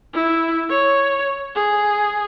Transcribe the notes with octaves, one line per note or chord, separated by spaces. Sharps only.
E4
C#5
G#4